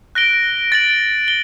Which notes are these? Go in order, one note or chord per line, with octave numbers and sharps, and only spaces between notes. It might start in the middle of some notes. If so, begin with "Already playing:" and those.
F#6 A#6 D7 G7
A6 D7 F#7
G7